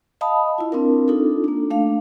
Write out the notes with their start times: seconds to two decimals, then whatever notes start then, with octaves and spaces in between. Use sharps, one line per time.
0.21 D#5 F5 A5 B5 D#6
0.58 E4 F4
0.72 C4 D4 A#4
1.08 D4 D#4 F4 A4
1.44 A#3 D4
1.70 A3 D4 F5